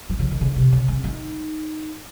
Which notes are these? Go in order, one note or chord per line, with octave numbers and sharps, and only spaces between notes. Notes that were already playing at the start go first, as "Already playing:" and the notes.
F3
C#3
D#3
C#3
C3
C#3
C4
D#4